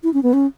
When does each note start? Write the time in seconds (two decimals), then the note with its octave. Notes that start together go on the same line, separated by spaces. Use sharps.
0.03 E4
0.14 C#4
0.23 B3
0.33 C#4